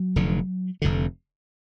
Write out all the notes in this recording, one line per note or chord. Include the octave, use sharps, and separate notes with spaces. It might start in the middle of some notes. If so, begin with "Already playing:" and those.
Already playing: F#3
F1 F2 D3
F1 F2 D3